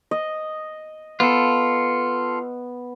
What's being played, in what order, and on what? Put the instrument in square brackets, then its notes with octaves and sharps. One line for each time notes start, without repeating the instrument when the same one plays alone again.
[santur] D#5
[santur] B3 [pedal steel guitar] F4 A4